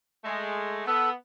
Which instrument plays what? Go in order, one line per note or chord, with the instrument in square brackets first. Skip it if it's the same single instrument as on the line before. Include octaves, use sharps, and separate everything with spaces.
[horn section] G#3 A3
[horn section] B3 [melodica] A4